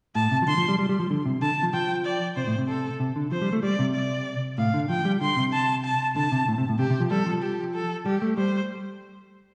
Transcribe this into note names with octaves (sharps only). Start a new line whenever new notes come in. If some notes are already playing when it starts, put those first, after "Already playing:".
A2 A5
C3
F3
D3 C6
F3
G3
G3
G3
F3
D3
C3
D3 A5
F3
F3 G5
D5
C3 C5
A2
C3
A4
C3
D3
F3 C5
G3
A3
G3 D5
C3
D5
A2 F5
D3
F3 G5
G3
D3 C6
C3
A5
A5
D3 A5
C3
A2
C3
A2
C3 G4
C3
F3
G3 A4
F3
G4
A4
G3 G4
A3
G3 C5